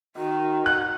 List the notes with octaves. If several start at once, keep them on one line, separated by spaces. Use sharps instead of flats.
D#3 F#4
F#5 F#6